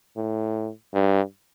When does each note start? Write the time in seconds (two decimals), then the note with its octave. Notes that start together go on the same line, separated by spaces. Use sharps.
0.17 A2
0.94 G2